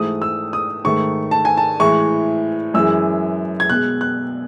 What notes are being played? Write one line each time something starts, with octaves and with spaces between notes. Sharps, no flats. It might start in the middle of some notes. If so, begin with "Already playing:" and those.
Already playing: G#2 E3 A3 D#6
E6
D#6
G#2 D#3 A3 C#6
A5
G#5
A5
A2 E3 G#3 C#6
F#2 E3 G#3 E6
G#6
B2 G#3 F#6
F#6